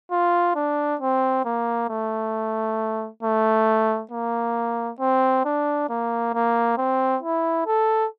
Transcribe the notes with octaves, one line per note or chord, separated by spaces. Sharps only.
F4
D4
C4
A#3
A3
A3
A#3
C4
D4
A#3
A#3
C4
E4
A4